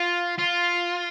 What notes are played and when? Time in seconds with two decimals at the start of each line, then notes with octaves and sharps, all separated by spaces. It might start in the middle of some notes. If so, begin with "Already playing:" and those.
Already playing: F4
0.38 F4